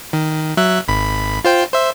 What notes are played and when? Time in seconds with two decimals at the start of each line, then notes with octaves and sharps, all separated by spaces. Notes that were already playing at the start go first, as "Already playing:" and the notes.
0.13 D#3
0.57 F#3 E5 F#6
0.88 G#1 B5
1.44 F4 C5 G5
1.73 C5 E5